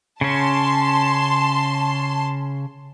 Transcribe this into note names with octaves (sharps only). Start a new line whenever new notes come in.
C#3 C#4 A5 C6